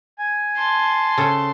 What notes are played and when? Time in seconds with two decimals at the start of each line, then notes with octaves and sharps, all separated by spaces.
0.18 G#5
0.56 A5 C6
1.18 C#3 A4